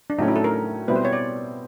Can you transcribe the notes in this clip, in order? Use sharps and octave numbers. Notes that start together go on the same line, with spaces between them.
D4
A2 F#3 A3 C#4 D#4
E4
A4
A#4
B2 G3 C4 E4 B4
C5
C#5
D5